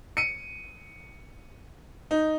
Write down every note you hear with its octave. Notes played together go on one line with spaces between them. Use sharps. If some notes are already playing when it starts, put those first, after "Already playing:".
C#7 D#7
D#4